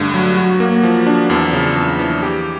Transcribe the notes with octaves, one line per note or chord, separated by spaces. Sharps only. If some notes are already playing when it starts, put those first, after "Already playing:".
Already playing: G2 D3 A3
F#3
F#4
A#3
F3
D4
E2
C#3
E2
E3
G4